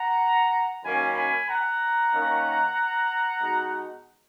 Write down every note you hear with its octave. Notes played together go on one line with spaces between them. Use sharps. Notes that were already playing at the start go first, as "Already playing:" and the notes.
Already playing: F#5 A#5
F#2 D#3 A#3 C#4 G#5 B5
G#5 B5
F#5 A#5
D#3 A#3 C#4
B2 G#3 D#4